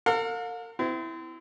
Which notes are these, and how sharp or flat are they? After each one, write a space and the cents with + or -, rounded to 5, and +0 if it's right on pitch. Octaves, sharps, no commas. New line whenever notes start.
A#4 -45 F5 +40
C4 -35 E4 +0